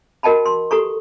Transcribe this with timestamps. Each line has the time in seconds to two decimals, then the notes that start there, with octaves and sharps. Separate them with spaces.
0.23 F#4 A#4 D#5 G5 A5 B5
0.46 C6
0.71 G4 A4 A#5 C#6